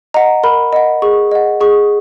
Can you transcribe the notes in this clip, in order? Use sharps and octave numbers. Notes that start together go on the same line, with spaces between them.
D#5 F#5 A#5
A#4 B5
D#5 F#5
G#4 C#6
D#5 F#5
G#4 C#6